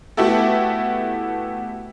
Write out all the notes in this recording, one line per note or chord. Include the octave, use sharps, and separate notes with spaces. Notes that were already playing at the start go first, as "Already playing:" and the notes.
A3 B3 E4 F#4 G4 A4